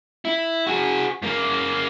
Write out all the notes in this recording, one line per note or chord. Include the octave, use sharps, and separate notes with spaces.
E4
F#4 G#4
F#2 A#3